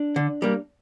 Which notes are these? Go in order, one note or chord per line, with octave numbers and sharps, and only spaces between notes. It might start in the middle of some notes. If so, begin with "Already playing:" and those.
Already playing: D4
D3
G3 A#3